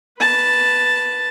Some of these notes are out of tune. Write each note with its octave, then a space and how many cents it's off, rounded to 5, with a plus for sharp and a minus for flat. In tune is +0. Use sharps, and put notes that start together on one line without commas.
B4 +0 A5 +0